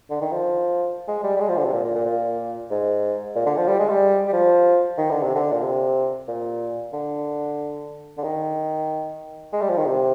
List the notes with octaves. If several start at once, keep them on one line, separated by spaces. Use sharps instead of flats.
D3
D#3
F3
G#3
G3
G3
G#3
F3
D3
C3
A#2
A#2
A#2
A#2
G#2
A#2
D3
F3
G3
G#3
G3
G3
F3
D#3
D3
C3
D3
A#2
C3
A#2
D3
D3
D#3
G#3
G3
F3
D#3
C3